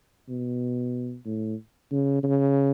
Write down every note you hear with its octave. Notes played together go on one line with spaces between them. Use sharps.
B2
A2
C#3
C#3